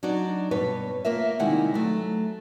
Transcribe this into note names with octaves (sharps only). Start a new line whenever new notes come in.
F#3 D4 D#4 F#4 D5
G2 B2 B4 C#5
A#3 F4 A#4 E5
C3 D#3 G3 G#3 E4 F#5
F#3 A3